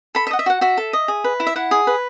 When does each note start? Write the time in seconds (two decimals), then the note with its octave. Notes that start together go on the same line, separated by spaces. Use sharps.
0.15 A4 B5
0.27 E5
0.31 D#5 F#5
0.39 E5
0.46 F#4 F#5
0.61 F#4 E5
0.77 A4
0.93 D#5
1.08 G#4
1.24 B4
1.40 E4
1.47 E5
1.56 E4 F#5
1.71 G#4
1.87 B4